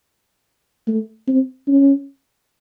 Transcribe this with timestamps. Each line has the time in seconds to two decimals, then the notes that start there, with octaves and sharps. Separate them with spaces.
0.87 A3
1.27 C4
1.68 C#4